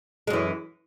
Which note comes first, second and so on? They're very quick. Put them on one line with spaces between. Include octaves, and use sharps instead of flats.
G#3 F#2 E3